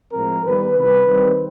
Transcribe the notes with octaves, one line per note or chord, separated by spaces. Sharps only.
A2 F3 G#3 C4 A#4
D#3 G3 B3 B4
C3 E3 G3 B4
D#3 G3 C4